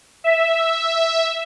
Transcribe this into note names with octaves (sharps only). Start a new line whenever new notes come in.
E5